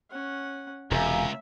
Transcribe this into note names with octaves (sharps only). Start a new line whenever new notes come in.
C#4 F#5
E1 C#2 C3 E5 F5 G#5 A#5